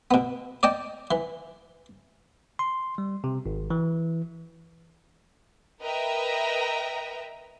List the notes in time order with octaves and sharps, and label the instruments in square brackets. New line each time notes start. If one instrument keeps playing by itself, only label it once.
[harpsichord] B2 B3
D5 D#5 G5 A5
E3
[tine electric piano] C6
G3
C3
G#1
E3
[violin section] A#4 B4 D#5 E5 G5 A#5